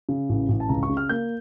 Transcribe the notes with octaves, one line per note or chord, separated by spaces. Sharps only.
C#3
A1
A1
A5
C#2 A#5
C#6
C#3
F6
A#3 G6